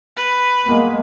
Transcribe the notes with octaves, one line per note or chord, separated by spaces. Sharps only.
B4
G#3 A#3 B3